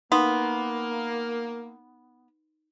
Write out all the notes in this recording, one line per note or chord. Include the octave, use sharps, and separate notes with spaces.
A#3 B3 D#4 C6